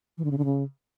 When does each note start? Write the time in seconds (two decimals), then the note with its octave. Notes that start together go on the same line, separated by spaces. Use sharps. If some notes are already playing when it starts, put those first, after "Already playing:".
0.18 E3
0.24 D3
0.31 C#3
0.38 D3
0.45 C#3